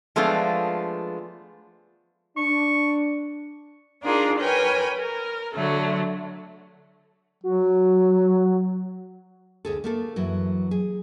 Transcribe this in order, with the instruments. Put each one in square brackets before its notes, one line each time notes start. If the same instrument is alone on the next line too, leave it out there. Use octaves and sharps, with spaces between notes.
[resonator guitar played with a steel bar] F3 G#3 A3 B3 D4 F4
[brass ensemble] D4 [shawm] C#6
[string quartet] D4 D#4 F4 G#4 A#4
A#4 B4 C#5 G5 G#5 B5
A#4
D3 F#3 A3 A4
[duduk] F#3 [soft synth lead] F#4
[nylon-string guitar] D2 G#4 A4
A3 A#3 A4
F#2 E3 F#3
G#4